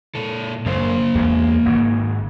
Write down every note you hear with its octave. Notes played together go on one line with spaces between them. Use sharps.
A#2 A4
F#2 C#3 A#3 C5
E2 G#3
G#1 G#2 C#3